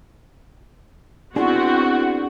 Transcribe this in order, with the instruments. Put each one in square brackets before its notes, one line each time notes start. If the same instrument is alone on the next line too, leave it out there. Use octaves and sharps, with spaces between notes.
[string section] B3 C4 F#5 [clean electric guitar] D4 G#4 [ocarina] E4 [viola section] F#4